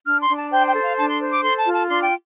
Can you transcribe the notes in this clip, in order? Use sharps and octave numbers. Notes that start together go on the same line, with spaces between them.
D4 F6
C6
D4
A5
C5 G5
G5
A4
F5
D4 A5
C6
C5
D6
A4 C6
A5
F4
A5
D4 C6
G5